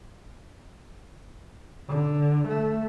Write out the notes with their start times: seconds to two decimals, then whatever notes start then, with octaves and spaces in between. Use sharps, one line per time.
1.89 D3
2.49 A3